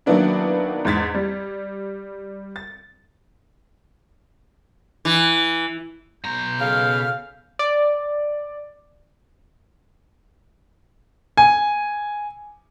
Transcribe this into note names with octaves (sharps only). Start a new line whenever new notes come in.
D#3 F#3 A#3 B3 D4 E4
E2 G#2 G#6 A6 B6
G3
A6
E3
B2 A#5 G6
C#3 A4 F5 F6
D5
G#5